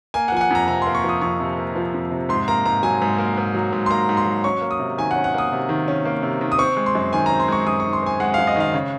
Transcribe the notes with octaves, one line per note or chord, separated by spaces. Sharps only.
A#3 G#5
F#5
F3 G#5
F#5
F2 A#5
C3 A#5
A#3 C6
C#6
F3 D#6
F2 C#6
C3
A#3
F3
F2
C3
G#2 C6
A#3 A#5
G#2 A#5
F#3 G#5
G#2
A#3
G#2
F#3
G#2
C6
A#3 A#5
G#2
C6
F#3
C#4 C#6
A#3
D#6
C3
D#3 G#5
F#5
C#4
F#5
A#3 D#6
C3
D#3
C#4
A#3
C3
D#3
D#6
C4 C#6
G#3
C6
F#2
D#3 G#5
C4 A#5
C6
G#3 C#6
F#2 D#6
D#3 C#6
C6
C4 G#5
G#3 F#5
F#2 F5
D#5
D#3 F5
C#3